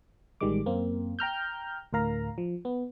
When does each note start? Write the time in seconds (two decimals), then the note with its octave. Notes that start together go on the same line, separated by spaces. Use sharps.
0.41 A1 D#3 G3 G#3 D6
0.66 F#2 A#3 C4
1.19 G5 A#5 F6 G6
1.93 D2 A2 A#4 F5 A#5
2.38 F3
2.65 B3